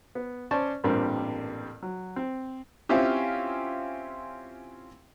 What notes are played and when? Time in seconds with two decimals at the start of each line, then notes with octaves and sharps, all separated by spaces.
0.15 B3
0.51 C#4 C5 D5 A5 C#6
0.84 A1 G2 A#2 G3 A#3 C4
1.83 F#3
2.16 C4
2.89 C4 C#4 E4 F4 G4